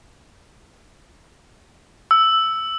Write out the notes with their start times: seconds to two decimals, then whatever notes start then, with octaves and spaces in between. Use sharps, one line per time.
2.11 E6